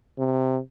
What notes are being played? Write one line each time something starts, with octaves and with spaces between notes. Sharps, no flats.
C3